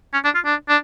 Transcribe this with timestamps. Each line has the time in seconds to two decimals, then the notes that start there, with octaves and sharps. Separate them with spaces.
0.13 C#4
0.24 D4
0.35 F4
0.45 D4
0.69 D4